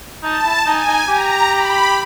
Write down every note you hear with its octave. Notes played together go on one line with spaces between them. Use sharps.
D#4 A5
E4
D#4 G#5
D#4
G4 A#5
B5